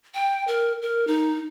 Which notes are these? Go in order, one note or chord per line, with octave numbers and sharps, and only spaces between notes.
G5
A#4
A#4
D#4